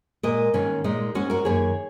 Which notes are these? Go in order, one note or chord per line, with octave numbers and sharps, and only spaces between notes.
A#2 G#3 A#4 D#5
G#2 D#3 G#3 C#4
A#2 G#3 D#4
G#2 G#3 C#4 F#4
F#4 A#4
F#2 D#3 A#3 G#4 C#5